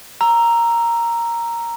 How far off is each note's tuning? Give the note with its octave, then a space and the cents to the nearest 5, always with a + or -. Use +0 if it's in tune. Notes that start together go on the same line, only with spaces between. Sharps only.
A#5 +0 E6 +20